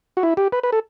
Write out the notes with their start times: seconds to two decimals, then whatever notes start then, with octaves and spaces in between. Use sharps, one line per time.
0.17 F#4
0.23 E4
0.37 G4
0.52 B4
0.63 B4
0.72 A4